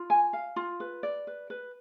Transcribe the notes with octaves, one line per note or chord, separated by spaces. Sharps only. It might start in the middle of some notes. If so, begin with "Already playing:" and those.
Already playing: F4
G#5
F5
F4
B4
D5
B4
B4